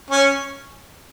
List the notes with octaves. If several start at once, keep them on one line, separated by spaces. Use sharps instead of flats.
C#4